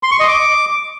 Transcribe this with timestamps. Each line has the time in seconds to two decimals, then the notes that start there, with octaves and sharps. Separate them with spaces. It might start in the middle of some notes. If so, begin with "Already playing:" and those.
0.03 C6
0.11 C#6
0.20 D#5
0.28 D6